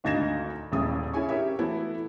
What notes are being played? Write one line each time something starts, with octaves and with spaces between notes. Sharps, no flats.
G#1 D2 D#4 G#6 A#6 E7
D#1 A1 C#3 D#6
C#4 E4 G#4 G#5 C#6
C#4 G4 A#4 E5
E3 A3 B3 E4 F#4